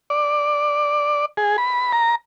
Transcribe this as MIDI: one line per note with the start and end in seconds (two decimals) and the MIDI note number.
0.10 1.25 74
1.37 1.57 68
1.58 1.92 83
1.93 2.15 82